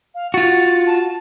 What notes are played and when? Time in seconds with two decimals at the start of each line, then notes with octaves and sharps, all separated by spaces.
0.15 F5
0.34 F4 F#4 A6
0.87 A5